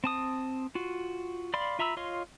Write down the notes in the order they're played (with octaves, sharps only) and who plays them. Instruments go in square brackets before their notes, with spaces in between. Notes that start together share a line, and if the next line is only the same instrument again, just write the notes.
[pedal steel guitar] C4 A5 D#6
F4 F#4
D5 F5 B5 C6
F4 E5 A#5 B5 E6
F4 C#5 D#5 F5 C6